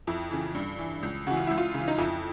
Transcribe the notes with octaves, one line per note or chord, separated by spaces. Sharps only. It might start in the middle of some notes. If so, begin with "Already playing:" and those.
F2 E4
C#3 E3
G2
E3
C#2
C#3 E3 F#4
F4
C#2 E4
F4
C#3 E3
D#4
F2 E4